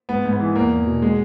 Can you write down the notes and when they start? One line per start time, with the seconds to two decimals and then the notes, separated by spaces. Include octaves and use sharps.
0.09 G#2 B3
0.25 G#2
0.32 B3
0.40 E3
0.56 E2 A#3
0.72 E2
0.87 B2
1.02 G#3